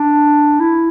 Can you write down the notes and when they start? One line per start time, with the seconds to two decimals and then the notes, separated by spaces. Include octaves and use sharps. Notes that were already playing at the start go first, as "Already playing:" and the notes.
Already playing: D4
0.60 E4